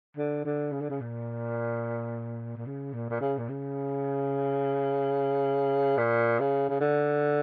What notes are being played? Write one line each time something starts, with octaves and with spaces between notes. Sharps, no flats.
D3
D3
C#3
D3
C#3
A#2
A#2
C#3
A#2
A#2
C#3
A#2
C#3
A#2
C#3
C#3
D3